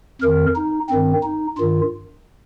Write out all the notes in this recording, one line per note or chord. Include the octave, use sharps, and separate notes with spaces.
F2 D#3 A#4
D#4
G2 D#3 C4
D#4
G2 D#3 F4